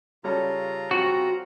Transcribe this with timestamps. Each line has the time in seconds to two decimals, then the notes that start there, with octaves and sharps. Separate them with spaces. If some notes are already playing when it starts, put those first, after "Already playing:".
0.24 C#3 G3 C#4 F4 A4 A#5
0.91 C4 F#4